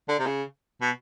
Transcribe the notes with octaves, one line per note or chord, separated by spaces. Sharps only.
D3
C3
C#3
B2